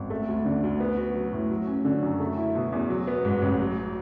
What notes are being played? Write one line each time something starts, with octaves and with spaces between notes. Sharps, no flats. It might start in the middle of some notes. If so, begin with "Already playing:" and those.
Already playing: G#1
A3
D2
D3
D2
B3
F#4
F#3
A2
F#3
C#4
D3
F#2
A3
E4
B2
E2
F#3
B3
G#2
A1
F#3